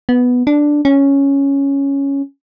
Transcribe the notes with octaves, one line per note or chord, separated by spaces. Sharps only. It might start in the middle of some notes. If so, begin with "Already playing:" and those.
B3
D4
C#4